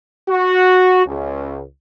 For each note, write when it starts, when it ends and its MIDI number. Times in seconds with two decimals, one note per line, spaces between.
0.29 1.06 66
1.06 1.62 37